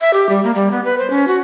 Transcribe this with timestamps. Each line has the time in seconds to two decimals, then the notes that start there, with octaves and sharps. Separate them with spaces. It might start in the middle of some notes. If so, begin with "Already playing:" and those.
0.01 E5
0.14 G4
0.29 G3
0.44 A#3
0.55 G3
0.71 B3
0.85 B4
0.98 C5
1.10 C#4
1.28 F#4